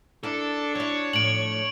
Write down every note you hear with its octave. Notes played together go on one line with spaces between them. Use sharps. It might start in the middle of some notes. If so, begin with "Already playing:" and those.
D4 E4 A4 A#4
F#3 E4 C#5
A2 F3 D7 F#7